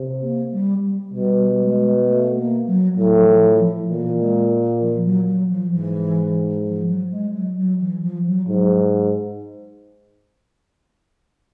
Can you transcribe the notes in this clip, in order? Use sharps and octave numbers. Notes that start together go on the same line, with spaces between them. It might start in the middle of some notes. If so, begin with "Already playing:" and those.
Already playing: C3
A#3
G3
B2 G3
G#3
A3
A#3
F#3
A2 F#3
F3
F3
F3
A#2 E3
G#3
F3
F#3
F#3
F3
G#2 E3
F3
F#3
G#3
F#3
F#3
E3
F3
F#3
G#2 F#3